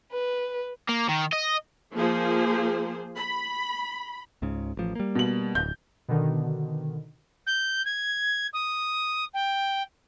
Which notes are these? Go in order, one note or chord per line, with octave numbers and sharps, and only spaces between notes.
B4
A#3
D#3
D#5
F3 A#3 G#4 C5
B5
C#2 G#2 C#3
A1 F3
G3 A#3
B2 F#7
D1 G6
B2 D3 D#3
G6
G#6
D#6
G5